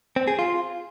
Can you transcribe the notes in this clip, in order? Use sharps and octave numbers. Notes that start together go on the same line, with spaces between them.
C4
G#4
F4